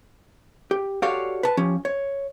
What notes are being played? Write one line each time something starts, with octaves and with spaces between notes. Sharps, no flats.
G4
F#4 G4 A4 C#5 D5 F5
B4 A5
F3 C#4 G4
C#5